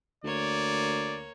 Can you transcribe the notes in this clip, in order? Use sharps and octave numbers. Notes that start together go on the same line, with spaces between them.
D2 A#3 C#5 D5